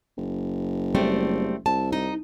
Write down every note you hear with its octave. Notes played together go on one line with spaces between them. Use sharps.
F#1
G3 A3 C4
C2 A5
D#4